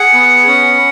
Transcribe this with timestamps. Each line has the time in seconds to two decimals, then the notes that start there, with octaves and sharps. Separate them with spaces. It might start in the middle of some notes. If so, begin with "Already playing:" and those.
Already playing: G#4 F#5
0.13 B3
0.47 C#4